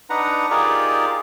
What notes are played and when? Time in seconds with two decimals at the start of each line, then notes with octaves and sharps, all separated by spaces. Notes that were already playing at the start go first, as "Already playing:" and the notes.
0.10 D4 D#4 B4 F#5 A#5
0.50 D#4 F4 G4 G#4 A#4 D5